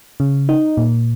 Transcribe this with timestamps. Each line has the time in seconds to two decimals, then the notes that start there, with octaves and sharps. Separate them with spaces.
0.20 C#3
0.49 D#4
0.77 A#2